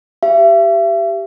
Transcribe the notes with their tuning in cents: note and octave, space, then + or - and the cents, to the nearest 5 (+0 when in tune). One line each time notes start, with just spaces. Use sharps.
G4 +0 E5 +35